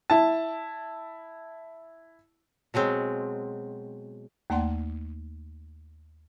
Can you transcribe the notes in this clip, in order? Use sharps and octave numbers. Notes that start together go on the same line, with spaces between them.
E4 A5
B2 F#3 G#3 C4
D#2 A3 A#3 D5 F#5 C6